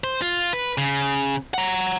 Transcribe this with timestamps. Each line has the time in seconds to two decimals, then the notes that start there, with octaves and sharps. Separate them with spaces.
0.04 C5
0.22 F4
0.53 B4
0.78 C#3
1.54 F#5 A#5